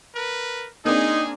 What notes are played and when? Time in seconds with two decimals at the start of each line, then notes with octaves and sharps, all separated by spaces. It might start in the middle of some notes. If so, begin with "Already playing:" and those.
0.15 A#4 B4
0.85 A#3 C4 D4 D#4 G#4